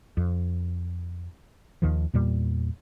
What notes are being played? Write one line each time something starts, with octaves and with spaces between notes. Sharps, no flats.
F2
D#2 D#3 F3
E2 A#2 G3 A#3